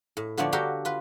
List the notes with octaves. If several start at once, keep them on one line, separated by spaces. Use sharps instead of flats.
A2
D3 F3 A3 B3 C#5 D5
F#4 G4 A4 A#4 F5 G5
F4 B4